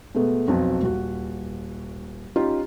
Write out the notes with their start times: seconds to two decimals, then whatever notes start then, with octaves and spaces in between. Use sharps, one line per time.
0.15 B2 G#3 A3 B3
0.48 B1 F2 F3 F#3 F#4
0.81 D#1 F#4
2.36 C#4 D#4 F4 G4